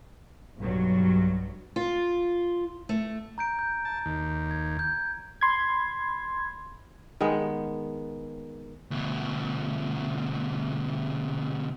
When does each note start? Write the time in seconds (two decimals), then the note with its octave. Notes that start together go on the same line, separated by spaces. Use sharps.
0.57 B1 G2 F#3
1.76 F4
2.89 A3
3.38 A#5 G6 D7
3.59 G6
3.85 A5
4.06 D#2
4.51 G#6
4.79 G6
5.41 B5 C6 G#6
7.21 D#3 G#3 B3
8.91 D2 B2